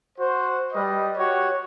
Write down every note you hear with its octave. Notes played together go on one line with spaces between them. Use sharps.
F#4 C5
G3 B4 D#5
F#4 G4 C#5